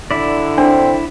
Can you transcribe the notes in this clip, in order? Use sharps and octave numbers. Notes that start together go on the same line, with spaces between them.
D3 E4 D5
C4 D4